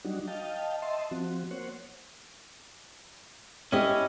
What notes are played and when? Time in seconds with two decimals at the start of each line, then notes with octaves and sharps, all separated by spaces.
0.05 F#3 G3 D4 D#4 F#4
0.27 D#5 F5 G5 A5
0.82 D#5 E5 A5 C6
1.11 F3 C4 F#4
1.51 A#3 C5 C#5 F#5
3.72 C#4 E4 G4 D#5